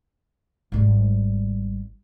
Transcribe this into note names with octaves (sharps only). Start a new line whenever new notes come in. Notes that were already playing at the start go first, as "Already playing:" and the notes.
G#1 G3